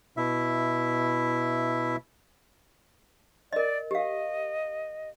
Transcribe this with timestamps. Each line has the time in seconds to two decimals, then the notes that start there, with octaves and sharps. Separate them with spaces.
0.17 B2 E4 E5
3.53 A#4 D5 D#5
3.91 G4 D#5 F5